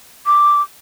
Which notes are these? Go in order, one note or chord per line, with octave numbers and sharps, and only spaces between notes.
D6